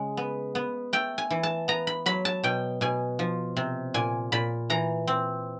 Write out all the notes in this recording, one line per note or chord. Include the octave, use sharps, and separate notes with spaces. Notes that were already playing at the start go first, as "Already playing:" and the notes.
Already playing: C#3 G#3
B3
B3
A3 G5
G#5
E3
A5
B3 A#5
B5
F#3 B5
A5
B2 G5
B2 G#5
F3
C3
A#2 G#5
A#2 B5
E3 A#5
C4